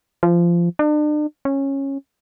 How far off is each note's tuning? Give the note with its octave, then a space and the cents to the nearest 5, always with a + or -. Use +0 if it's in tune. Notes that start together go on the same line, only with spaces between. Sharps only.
F3 -20
D4 +40
C#4 -15